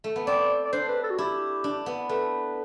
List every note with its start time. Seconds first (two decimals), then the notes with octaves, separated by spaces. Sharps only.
0.04 A3
0.16 B3
0.27 C4 D5
0.65 D5
0.73 D4 C5
0.88 B4
1.03 A4
1.10 F#4
1.18 E4 G4
1.64 D4
1.86 B3
2.09 A3 B4